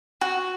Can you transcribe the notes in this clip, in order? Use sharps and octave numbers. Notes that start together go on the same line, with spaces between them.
F#4